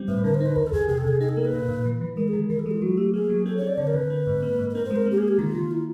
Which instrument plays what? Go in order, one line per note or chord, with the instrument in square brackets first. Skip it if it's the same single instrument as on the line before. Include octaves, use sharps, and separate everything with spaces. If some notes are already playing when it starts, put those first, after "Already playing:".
Already playing: [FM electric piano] G3 C4
[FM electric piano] A2 [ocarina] B4
[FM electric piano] D3 [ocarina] A#4
[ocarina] C5
[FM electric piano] D#4
[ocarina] B4
[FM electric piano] E2 [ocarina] A#4
[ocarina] A4
[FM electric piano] E2 [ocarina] G#4
[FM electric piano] C3 [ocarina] G#4
[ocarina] A4
[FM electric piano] C3 [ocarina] G#4
[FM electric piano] D#4 [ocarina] G#4
[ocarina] A4
[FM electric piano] A#3 [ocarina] A#4
[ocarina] B4
[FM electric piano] A#2
A#2
E3
E3
[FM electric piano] G#3 [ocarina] A#4
[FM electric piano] D#3 [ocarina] G#4
[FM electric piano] E3 [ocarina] A#4
[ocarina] A4
[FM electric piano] G#3
[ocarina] F4
[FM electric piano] F#3 [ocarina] F#4
[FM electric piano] A3 [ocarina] G4
[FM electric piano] A#3 [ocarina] G#4
[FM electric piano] F#3
[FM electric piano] C4 [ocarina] A4
[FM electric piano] C4 [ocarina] C#5
[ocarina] D5
[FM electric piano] D3 [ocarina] C#5
[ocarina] A#4
[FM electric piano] D3 [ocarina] B4
[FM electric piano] C4
G#2
A#3
G#2
[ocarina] B4
[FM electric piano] C4 [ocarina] A#4
[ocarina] C5
[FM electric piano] G#3
[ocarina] A#4
[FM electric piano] A#3 [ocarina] G4
[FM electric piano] A#3 [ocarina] G#4
[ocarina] G4
[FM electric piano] D#3 [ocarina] F4
[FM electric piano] D#3
[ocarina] E4